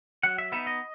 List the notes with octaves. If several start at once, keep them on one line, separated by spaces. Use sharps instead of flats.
F#3 F#5
E5
B3 D#4 E5
D#5